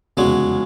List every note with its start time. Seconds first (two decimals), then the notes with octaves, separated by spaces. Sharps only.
0.17 F1 E2 C#3 F#3 G#3